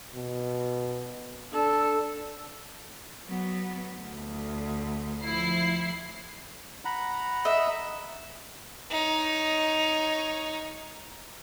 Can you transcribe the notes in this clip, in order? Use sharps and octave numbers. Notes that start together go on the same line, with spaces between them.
B2
D4 A4
F#3 B3
D2
F3 E4 C7
F#5 A#5 B5
D#5 E5
D#4 C#5